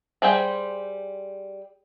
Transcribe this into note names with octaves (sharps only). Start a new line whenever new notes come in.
G3 G#4 C5 G5